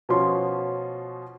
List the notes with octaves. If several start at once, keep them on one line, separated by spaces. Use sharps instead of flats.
B2 F3 C#4 C6